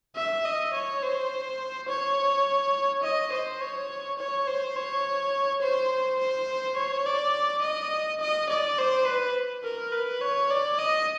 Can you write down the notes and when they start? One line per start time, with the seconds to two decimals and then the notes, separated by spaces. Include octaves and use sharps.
0.16 E5
0.45 D#5
0.73 C#5
1.02 C5
1.88 C#5
3.03 D#5
3.32 C5
3.61 C#5
4.19 C#5
4.47 C5
4.76 C#5
5.62 C5
6.19 C5
6.77 C#5
7.06 D5
7.62 D#5
8.20 D#5
8.49 D5
8.78 C5
9.06 B4
9.64 A#4
9.92 B4
10.21 C#5
10.50 D5
10.78 D#5